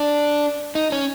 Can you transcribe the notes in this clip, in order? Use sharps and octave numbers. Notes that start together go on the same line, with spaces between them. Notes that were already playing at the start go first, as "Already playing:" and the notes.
Already playing: D4
D#4
C#4